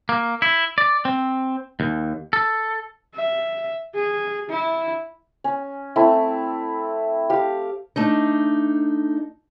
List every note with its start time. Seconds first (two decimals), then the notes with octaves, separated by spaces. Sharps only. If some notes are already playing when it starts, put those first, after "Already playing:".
0.09 A#3
0.42 E4
0.78 D5
1.05 C4
1.80 D#2
2.33 A4
3.15 E5
3.95 G#4
4.50 E4
5.44 C#4
5.96 A3 C4 E4
7.30 G4 F5
7.96 A3 D4 D#4